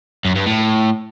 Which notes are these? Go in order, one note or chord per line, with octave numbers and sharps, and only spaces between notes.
F#2
G2
A2